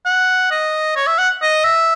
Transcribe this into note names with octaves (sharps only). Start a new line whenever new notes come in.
F#5
D#5
C#5
E5
F#5
D#5
E5